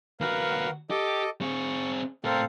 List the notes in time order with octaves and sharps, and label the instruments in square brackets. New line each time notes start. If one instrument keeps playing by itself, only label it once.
[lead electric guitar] D#2 F#4 [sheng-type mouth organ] A#4 B4 F5
[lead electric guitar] G4 [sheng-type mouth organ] A4 D#5 D6
[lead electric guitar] C4 G#4 [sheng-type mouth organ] C#6
[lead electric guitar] A2 A#4 [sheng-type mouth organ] C4 A4 F5